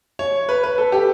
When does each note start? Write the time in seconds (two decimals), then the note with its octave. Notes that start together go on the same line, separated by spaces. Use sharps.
0.19 C#5
0.49 B4
0.63 B4
0.78 A4
0.92 G4